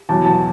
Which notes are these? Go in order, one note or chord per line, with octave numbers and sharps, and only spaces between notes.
E2 B2 F#3 A5
A5